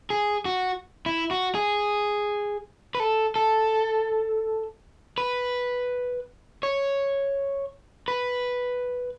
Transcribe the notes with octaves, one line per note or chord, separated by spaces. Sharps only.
G#4
F#4
E4
F#4
G#4
B4
A4
A4
B4
C#5
B4